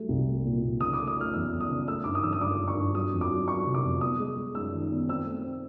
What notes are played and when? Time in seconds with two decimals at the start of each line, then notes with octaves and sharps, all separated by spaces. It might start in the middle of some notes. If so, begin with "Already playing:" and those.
Already playing: F#3 G3 A3
0.09 C2
0.27 A3
0.45 A#2
0.62 A#2
0.81 C#3 D#6
0.93 D6
0.99 A3
1.07 D#6
1.17 A3 F6
1.33 E2 E6
1.52 E2
1.60 D#6
1.70 C#3
1.87 A3 E6
2.04 G2 D6
2.15 D#6
2.23 E3 E6
2.33 D#6
2.41 G2 D6
2.59 G2
2.68 C#6
2.77 G2
2.94 F#3 D#6
3.13 F2
3.21 D6
3.30 F#3
3.48 F#3 C#6
3.66 C3
3.74 D6
3.84 F2
4.01 B3 D#6
4.19 G#3
4.37 G#3
4.55 F#2 E6
4.74 D#3
4.91 B3
5.08 C4 E6
5.26 A3
5.44 C4